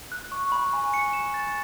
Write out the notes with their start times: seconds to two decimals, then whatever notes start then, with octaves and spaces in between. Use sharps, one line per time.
0.12 F#6
0.32 C#6
0.52 B5
0.73 G#5
0.94 C#7
1.13 E7
1.34 A6